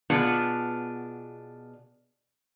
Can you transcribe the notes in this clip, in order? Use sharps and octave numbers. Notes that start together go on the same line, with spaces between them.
B2 B3 D4 F4 G#4